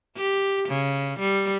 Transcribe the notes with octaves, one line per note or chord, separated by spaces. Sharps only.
G4
C#3
G3